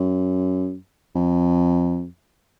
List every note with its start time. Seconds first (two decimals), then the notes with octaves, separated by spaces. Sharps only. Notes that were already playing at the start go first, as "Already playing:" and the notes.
Already playing: F#2
1.15 F2